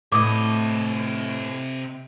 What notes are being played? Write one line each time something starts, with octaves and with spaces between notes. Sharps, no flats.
A2 C3 D#5 D6 D#6